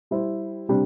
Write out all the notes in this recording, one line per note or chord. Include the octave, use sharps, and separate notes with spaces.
G3 E4 C5
C3 G3 D4